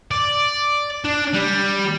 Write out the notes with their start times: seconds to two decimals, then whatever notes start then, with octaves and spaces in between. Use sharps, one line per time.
0.11 D5
1.05 D4
1.33 G3